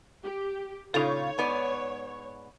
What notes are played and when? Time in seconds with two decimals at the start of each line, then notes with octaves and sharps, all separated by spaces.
0.23 G4
0.94 A#2 C#3 D#4 F4 A4 C#5
1.38 G#2 B3 D5